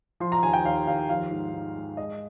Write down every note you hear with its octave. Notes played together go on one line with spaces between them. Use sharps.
F3 C6
A#5
D#2 G#5
G5
D#2 F5
D#2 F5
F3 F5
G#2
G#2
G#3
G#3 D#5